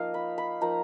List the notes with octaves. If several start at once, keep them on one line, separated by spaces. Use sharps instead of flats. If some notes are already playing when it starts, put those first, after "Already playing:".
Already playing: F3 A#3 D#4 D#5 F5
B5
B5
F3 A#3 D#4 A#5